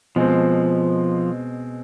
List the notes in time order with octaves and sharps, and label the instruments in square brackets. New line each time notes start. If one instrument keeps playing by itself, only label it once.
[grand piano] B2 G#3 C4 [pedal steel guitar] F3